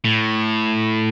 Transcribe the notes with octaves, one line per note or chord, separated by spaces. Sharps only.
A2